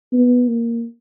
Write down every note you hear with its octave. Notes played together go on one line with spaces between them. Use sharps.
B3
A#3